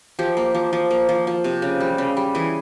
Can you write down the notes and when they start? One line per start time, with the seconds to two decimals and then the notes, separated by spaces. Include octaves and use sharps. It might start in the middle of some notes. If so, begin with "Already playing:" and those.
0.19 F3 G4
0.37 A#3
0.55 F3
0.73 F3
0.91 A#3
1.09 F3
1.27 F3
1.44 C3
1.62 C#3
1.80 G3
1.98 C#3
2.17 G3
2.35 E3 G#4